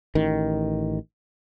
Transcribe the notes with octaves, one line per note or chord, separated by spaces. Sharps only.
A1 D#3